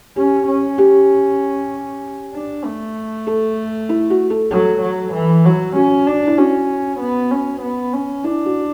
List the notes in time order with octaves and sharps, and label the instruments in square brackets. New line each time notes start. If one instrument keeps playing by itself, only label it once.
[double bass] C#4 [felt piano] G4
[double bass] C#4
[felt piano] G4
[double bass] D4
A3
[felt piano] A4
E4
F#4
A4
[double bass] F#3 [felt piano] A4
[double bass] F#3
E3
F#3
[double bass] C#4 [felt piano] F#4
[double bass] D4
[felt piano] E4
[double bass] C#4 [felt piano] F#4
[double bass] B3
C#4
B3
C#4
[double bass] D4 [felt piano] E4
[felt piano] F#4